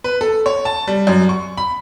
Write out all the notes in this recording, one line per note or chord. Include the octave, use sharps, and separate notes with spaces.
B4
A4
C#5
A5
G3
F#2
C#6
B5